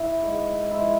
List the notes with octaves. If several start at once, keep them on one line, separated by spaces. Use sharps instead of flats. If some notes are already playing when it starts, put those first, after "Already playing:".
Already playing: E4
G#2 G#3
G#2 F3 G#3 E4